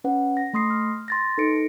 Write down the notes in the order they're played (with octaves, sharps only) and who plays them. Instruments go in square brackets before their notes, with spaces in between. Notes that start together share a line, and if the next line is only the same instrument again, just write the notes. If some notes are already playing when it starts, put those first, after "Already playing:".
[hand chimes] C#4 B4 F#5
A#6
A3 B5 C6 D#6 A#6 C7
F6
C6 A6 A#6
D#4 A4 B4 A#6 C#7 D7